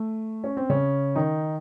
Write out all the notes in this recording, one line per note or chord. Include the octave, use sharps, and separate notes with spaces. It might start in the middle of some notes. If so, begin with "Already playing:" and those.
Already playing: A3
C#4
C4
C#3 C#4
D#3 D#4